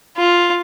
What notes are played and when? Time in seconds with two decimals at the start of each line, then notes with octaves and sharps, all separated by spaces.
0.17 F4